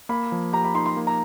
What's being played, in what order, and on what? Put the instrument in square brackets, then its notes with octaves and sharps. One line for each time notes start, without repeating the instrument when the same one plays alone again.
[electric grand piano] A#3 [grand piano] B5
[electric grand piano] F3
[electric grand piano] G4 [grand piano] A#5
[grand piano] B5
[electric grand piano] D#4 [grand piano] C6
[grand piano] C6
[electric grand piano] A#3
[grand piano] A#5